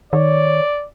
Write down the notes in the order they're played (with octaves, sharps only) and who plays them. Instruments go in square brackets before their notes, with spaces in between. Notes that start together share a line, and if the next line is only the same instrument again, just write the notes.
[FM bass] D#3 [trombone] C#5 [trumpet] D5